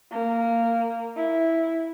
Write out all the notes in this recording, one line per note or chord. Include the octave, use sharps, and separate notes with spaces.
A#3
E4